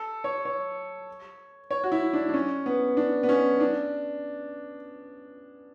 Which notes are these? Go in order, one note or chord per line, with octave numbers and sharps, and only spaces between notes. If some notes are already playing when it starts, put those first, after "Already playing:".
Already playing: A4
C#5
C#5
C#5
F#4
E4
D4
D4
C#4
B3
D4
B3
C#4
D4